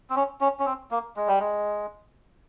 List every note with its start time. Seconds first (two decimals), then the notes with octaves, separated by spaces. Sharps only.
0.10 C4
0.16 C#4
0.41 C#4
0.60 C#4
0.66 C4
0.91 A#3
1.16 G#3
1.28 G3
1.40 G#3